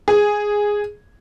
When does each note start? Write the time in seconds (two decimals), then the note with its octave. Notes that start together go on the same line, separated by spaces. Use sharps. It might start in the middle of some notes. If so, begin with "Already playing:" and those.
0.08 G#4